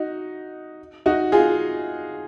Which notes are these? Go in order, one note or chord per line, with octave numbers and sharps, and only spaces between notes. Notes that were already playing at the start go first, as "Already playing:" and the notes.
Already playing: D#4 F#4
D#4 F#4
F4 G#4